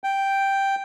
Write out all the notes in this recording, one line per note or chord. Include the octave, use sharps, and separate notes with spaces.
G5